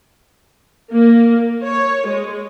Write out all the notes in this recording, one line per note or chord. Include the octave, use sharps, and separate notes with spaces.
A#3
C#5
G#3